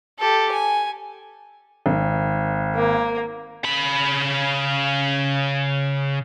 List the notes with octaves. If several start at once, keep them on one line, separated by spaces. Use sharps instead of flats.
G4 A4
G#5
G#1
A#3
C#3 B5